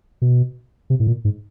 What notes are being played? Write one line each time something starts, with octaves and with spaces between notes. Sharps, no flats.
B2
C3
A2
A#2
G#2